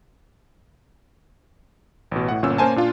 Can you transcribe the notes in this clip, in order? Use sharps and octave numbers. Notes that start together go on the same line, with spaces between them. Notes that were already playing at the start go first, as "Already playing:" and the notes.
A1 B2
A2 F#5
G1 A#2 C#4 E6
A#3 C#4 A#4 C5 G#5 A5
A#2 D4 F4